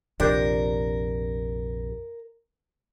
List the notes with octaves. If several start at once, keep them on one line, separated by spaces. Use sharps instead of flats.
A#1 F2 C3 D4 G4 A#4 C5